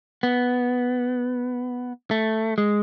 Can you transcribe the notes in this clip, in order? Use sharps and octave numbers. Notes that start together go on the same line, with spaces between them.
B3
A3
G#3